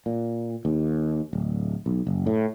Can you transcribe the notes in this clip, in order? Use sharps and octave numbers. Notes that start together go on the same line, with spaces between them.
A#2
D#2
D1
B1
F#1
A2